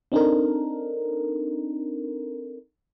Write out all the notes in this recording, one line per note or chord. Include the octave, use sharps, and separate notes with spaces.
C4 D4 D#4 A4 A#4